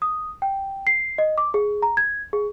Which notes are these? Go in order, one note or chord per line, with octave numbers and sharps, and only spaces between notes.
D#6
G5
C7
D#5
D6
G#4
A#5
G#6
G#4